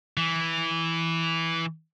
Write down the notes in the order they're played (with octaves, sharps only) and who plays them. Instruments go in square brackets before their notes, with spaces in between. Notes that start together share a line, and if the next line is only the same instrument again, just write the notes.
[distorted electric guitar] E3